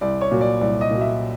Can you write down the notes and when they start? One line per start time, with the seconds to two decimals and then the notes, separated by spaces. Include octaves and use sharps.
0.01 C2 D5
0.21 C#5
0.31 A#2 F#3
0.41 D5
0.61 C2 D5
0.81 D#5
0.91 A#2 F#3
1.01 E5